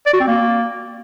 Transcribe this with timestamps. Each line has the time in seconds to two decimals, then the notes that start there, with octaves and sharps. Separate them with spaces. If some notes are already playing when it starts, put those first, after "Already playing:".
0.06 D5
0.13 F#4
0.20 C4
0.27 A#3